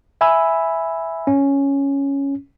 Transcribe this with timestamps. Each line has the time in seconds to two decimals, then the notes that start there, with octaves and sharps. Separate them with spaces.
0.21 E5 G#5 B5 E6
1.27 C#4